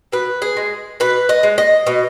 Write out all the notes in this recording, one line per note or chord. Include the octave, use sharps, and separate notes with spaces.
B2 B4
G#4
G#3
B2 B4
D#5
G#3
D#5
B2